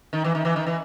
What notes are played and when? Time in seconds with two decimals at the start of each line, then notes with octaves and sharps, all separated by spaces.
0.13 D#3
0.24 E3
0.35 D#3
0.45 E3
0.56 D#3
0.67 E3